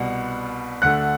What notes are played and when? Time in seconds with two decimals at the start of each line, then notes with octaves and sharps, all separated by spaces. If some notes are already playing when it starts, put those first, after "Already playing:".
Already playing: C2 B2 G3 F#5
0.82 D2 D3 A3 F#5 F#6